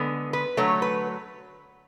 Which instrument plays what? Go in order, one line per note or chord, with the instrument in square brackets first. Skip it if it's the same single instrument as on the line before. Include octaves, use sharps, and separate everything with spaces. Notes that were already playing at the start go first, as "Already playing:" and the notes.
Already playing: [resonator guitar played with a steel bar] D3 G#3 B3
B4
D3 F#3 A3 C#5
B4